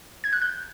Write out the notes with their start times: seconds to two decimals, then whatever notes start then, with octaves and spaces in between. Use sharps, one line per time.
0.24 G#6
0.33 F#6
0.42 G6